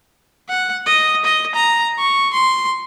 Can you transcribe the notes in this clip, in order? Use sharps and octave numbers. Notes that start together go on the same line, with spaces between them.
F#5
D#5
D#5
A#5
C#6
C6